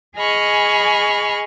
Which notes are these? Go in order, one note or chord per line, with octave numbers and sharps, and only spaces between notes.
G#4 D#5 G#5 B5 C#6 F6